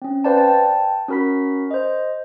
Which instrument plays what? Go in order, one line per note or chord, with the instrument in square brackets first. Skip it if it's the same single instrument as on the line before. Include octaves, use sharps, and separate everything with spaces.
[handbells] C4 C#4
B4 C5 D5 F5 G5 A5
G5 A5
C#4 F#4 A#4 B5 B6
C5 D#5